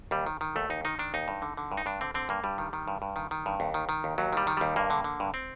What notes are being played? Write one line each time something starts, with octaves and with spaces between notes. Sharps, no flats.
D#2 G3
D#3
D#3
D#2 A3
D#2 D#4
D#3 D#4
D#3 D4
D#2 D#4
G2
D3
D3
G2
D#4
G2 D4
D3 C4
D3 C4
G2 A#3
G2 G3
D#3
D#3
G2
G2
D#3
D#3
G2
D#2
D#3
D#3
D#2
D#2 F#3
D#3 G3
D#3
D#2 G3
G2 A#3
D3
D3
G2
C4